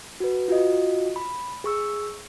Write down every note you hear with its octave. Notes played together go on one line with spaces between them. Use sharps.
F#4 B4
F4 F#4 D#5
B5
G#4 C#6 E6